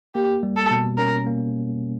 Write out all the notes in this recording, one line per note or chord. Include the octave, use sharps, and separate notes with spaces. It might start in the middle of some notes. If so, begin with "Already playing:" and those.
A#3 G4
G3
A4
B2
C#4 A#4
A#3